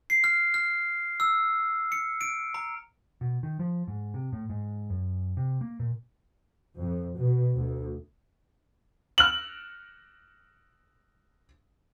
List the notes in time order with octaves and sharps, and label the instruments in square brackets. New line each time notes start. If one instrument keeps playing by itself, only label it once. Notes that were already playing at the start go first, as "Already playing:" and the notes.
[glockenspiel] C7
F6
F6
E6
C#7
D7
A#5
[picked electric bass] B2
D#3
F3
G#2
C3
A2
G#2
F#2
C3
A#3
A#2
[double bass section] F2
B2
D2
[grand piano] F6 F#7